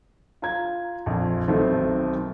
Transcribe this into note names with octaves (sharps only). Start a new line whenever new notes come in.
F4 A#5 G#6
A#1 F2
B1 D#3 A3 C4